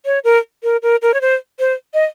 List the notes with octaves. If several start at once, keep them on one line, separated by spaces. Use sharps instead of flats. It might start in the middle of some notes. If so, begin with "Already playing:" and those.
C#5
A#4
A#4
A#4
A#4
C#5
C5
C5
D#5